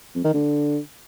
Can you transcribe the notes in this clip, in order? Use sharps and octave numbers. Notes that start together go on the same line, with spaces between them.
F2
D#3
D3